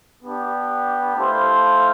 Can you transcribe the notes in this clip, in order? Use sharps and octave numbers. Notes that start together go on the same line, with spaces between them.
B3 D4 G4
A3 E4 A4 C5 F5